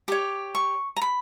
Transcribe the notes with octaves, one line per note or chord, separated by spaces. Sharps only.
G4 C#5 D6
C#6
A#5
B5